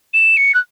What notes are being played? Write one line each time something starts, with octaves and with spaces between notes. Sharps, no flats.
E7
C#7
F#6